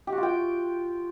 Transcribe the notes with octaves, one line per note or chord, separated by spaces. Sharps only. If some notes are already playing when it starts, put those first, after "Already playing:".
G4
F#4
F4
G5